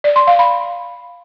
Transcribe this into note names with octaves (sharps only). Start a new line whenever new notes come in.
D5
C6
F5
B5